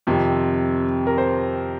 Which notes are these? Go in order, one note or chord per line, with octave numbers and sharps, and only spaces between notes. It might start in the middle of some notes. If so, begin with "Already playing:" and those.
F2 C3 D#3
A#4
C5